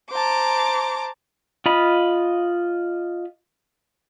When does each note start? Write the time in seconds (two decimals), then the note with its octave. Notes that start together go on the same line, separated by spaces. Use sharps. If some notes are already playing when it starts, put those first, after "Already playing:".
0.11 C5 A5 A#5 D6
1.66 F4 D#5 B5